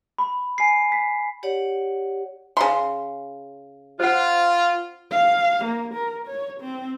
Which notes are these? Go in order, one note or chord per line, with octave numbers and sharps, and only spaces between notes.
B5
G#5 C7
B6
G4 C#5 D5 F#5
C#3 C6
F4 C5 F#5
F5
A#3
A#4
C#5
C4